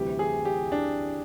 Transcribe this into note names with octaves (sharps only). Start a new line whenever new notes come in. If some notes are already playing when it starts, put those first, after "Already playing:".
Already playing: D2 C3 E3 G3 G4
G#4
G4
D4